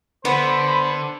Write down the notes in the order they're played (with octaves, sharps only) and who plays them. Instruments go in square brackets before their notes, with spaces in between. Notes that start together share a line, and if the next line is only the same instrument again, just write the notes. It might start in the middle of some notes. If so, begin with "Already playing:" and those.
[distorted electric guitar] D3 D4 [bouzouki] B3 [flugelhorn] C5 [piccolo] B5